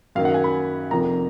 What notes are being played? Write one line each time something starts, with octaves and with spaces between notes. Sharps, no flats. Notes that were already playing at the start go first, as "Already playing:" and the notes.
F#2 D#3 F#3 A#3 F5
F#5
G#5
B5
F1 F2 F3 A#3 A#5